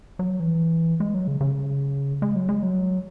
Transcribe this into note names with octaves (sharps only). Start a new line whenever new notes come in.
F#3
E3
G#3
F#3
C#3
C#3
G#3
F#3
G#3
F#3